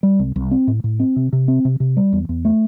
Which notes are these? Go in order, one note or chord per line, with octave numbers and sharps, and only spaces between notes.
G3
C2
C2
C4
A2
A2
C4
C3
C3
C4
C3
C3
G3
E2
E2
A3